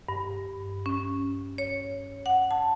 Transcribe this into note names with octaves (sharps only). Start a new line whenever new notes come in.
G2
C#4
C#5
F#5
A5